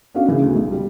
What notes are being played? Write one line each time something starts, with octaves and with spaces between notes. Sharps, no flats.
B3 C#4 D4 F#4 F5
C#3 E3 A#3 B3
D2
B1
G3